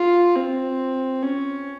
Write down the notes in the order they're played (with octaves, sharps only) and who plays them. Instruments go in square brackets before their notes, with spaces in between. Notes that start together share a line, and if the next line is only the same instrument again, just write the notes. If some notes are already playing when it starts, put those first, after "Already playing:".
Already playing: [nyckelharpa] F4
C4
C#4